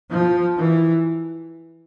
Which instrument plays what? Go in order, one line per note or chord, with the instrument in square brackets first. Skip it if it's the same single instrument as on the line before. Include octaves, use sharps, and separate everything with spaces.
[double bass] F3
E3